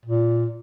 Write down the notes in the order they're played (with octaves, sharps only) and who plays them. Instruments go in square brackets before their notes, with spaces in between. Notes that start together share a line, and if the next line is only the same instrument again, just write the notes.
[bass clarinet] A#2